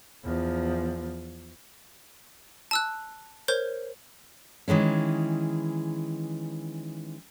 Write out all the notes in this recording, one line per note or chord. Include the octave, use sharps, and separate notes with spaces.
E2 F3
A5 E6 F#6
A#4 C5 C#5 G6
D#3 E3 G#3 C#4